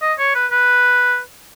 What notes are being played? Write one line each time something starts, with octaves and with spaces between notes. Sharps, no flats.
D#5
C#5
B4
B4